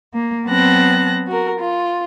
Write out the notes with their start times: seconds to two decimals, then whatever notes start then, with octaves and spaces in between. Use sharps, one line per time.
0.13 A#3
0.47 F#3 B3 C4 A5 F#6 A#6
1.27 F#4 A#4
1.58 F4